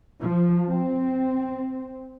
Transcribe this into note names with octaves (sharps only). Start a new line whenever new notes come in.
F3
C4